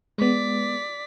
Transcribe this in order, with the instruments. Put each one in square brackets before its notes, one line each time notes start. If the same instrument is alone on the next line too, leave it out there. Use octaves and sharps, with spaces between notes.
[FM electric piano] G#3 B3 [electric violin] D5 B6